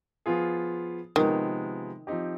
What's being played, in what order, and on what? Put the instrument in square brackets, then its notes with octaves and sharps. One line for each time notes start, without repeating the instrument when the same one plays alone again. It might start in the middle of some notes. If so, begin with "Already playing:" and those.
[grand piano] F3 B3 F4 G#4
[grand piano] C3 F3 G#3 B3 [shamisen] D#3
[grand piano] F3 C4 D#4 G4